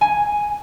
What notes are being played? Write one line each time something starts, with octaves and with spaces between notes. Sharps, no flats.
G#5